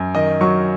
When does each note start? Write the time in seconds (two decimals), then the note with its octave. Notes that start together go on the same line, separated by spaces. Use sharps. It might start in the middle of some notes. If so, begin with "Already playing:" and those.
Already playing: F#2
0.15 D#3 D#5
0.41 F#3 C#6